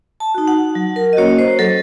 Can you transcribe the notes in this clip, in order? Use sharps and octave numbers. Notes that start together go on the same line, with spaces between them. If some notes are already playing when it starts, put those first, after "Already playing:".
A5
D#4 F#4
F#5
F#3
A#4
D#5
A#3 C#4 F#4 C#5
C5
F#3 A4